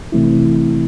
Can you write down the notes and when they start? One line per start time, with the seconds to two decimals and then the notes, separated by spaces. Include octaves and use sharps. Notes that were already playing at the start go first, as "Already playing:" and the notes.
0.12 C3 E3 A3 C4 E4